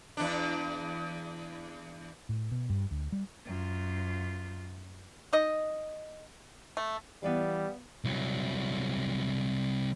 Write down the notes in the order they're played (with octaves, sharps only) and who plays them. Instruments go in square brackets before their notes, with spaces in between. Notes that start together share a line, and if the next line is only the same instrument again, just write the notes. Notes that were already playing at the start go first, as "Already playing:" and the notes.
[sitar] E2 D4
[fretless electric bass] A2
B2
G2
D2
G3
[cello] F#2 F4
[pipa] D#4 D#5
A3
[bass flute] E3 [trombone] G3 [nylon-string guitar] B3 D5 F5
[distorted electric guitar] C2 F#3